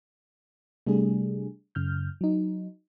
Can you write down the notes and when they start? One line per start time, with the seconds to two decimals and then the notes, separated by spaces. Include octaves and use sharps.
0.87 C3 G3 A3 D4 G#4
1.75 F#2 C#3 F6 G6
2.21 F#3 D#4